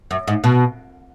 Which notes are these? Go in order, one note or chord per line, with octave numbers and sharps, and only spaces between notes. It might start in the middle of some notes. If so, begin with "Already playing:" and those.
F#2
G#2
B2